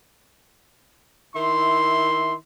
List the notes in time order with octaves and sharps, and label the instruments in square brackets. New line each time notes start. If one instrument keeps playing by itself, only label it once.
[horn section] D#3 E4 E5 C6